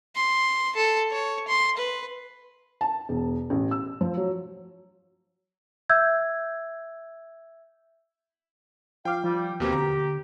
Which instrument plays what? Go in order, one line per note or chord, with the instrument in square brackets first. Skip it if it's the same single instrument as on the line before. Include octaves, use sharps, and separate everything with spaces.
[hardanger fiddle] C6
A4
C#5
C6
B4
[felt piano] A5
E1
A1
E6
F3
F#3
[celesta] E5 E6 G6 G#6
[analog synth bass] F3 [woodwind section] F5 [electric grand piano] G5 D6
[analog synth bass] F3 [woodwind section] G3
[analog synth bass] D#2 [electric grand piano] B2 A#3 C4 [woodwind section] G4
[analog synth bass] D3 [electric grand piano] A#5